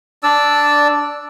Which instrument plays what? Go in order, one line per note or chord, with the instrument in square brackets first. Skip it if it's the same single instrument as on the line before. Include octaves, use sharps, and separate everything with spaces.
[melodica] D4 D5 E6